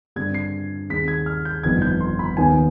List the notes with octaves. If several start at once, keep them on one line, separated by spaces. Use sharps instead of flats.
G2 D3 G3 C4 G#6
C7
D#2 D#3 G#3 C4 B6
G#6
F6
G6
G1 F2 D#3 B3 G#6
G6
C6
B5
D#2 D#3 B3 G#5